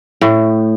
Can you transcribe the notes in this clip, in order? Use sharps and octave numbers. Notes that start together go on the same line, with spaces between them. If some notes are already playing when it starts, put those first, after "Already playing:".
A2